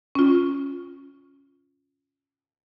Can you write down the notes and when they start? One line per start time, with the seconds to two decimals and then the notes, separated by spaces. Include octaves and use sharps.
0.15 C#4 F4